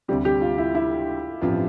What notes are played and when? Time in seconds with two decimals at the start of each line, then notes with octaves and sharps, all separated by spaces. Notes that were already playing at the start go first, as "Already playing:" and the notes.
0.08 D2 C3 G3 C4 G4
0.25 G4
0.42 F4
0.58 E4
0.75 E4
1.41 A1 G2 F3 C4 F4